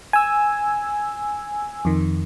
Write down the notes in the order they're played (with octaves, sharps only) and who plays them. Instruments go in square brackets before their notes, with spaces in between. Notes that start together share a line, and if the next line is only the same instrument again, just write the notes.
[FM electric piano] G#5 E6
F2 D#3